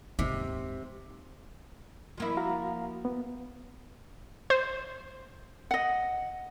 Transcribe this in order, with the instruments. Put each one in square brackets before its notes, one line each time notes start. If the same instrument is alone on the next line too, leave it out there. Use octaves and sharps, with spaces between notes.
[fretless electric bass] D#1 D#2 G#2 [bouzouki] C3 [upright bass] D#4
[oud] F3 A#3 E4
[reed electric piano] F#4 F5 A#5
B3
[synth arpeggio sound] C5
[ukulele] D#5 F#5